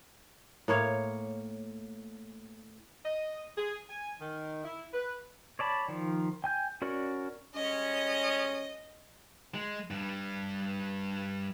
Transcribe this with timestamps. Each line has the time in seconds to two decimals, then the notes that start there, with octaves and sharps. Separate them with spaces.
0.68 A2 A#3 C#5 F5
3.05 D#5
3.57 G#4
3.90 G#5
4.21 D#3
4.65 E4
4.93 B4
5.59 C#5 D5 A5 B5
5.88 D#3 F3
6.44 G5 G#5 G6
6.82 C#4 F#4 A#4 D5
7.55 G3 G#3 C#4 D#5
9.54 G#3
9.91 G2 G3